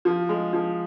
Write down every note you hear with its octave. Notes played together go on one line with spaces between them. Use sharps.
F3
G#3
F3